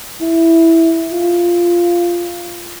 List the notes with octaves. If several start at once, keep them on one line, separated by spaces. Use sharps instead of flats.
E4
F4